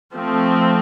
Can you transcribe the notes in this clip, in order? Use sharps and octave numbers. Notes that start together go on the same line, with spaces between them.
F3 A3 C4